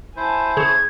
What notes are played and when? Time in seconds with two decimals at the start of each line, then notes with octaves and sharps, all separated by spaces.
0.17 E4 C5 G#5 A5
0.57 C#3 G#6